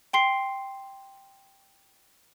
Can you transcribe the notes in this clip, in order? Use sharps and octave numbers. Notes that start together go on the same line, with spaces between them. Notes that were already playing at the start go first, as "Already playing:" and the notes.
G5 C6 C7